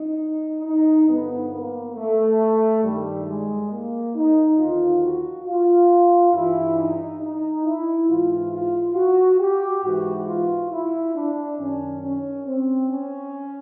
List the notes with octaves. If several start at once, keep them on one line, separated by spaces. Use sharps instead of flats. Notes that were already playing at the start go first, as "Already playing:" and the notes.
Already playing: D#4
D#4
G2 D3 F3 B3
A#3
A3
G2 D#3 G3
G#3
A#3
D#4
D#2 D3 F3 F4
F#4
F4
G2 E3 E4
D#4
D#4
E4
G#2 E3 F4
F4
F#4
G4
G#2 E3 F#4
F4
E4
D4
F#2 D#3 C#4
C#4
C4
C#4